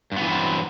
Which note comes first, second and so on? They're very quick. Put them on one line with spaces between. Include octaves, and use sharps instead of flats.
G2 B3 E3 C4 F#3